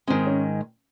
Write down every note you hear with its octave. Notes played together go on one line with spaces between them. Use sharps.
G#2 D#3 G#3 C4
C#4